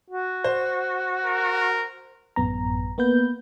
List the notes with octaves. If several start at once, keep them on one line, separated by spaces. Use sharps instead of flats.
F#4
C5
A#4
A1 F#2 B3 A#5
A#3 B3 B4 G6